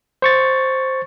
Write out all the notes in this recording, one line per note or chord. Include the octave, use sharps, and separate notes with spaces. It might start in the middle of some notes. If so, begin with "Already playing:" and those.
C5 C#6 A6